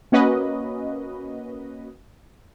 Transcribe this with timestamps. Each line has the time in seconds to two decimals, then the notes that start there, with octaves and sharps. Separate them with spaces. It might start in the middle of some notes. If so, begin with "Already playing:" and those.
0.12 A#3 C#4 F#4 B4 D#5